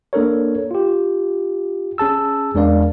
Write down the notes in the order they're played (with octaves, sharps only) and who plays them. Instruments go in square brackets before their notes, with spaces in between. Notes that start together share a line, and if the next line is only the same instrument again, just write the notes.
[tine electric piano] A#3 D4 A4 A#4 C#5
F4 G4
C#4 G#4 A5 E6
E2 G#3 D4 A#4 D5 F5